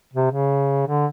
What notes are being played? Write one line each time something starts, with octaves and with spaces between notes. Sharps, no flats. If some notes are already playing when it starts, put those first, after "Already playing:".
C3
C#3
D3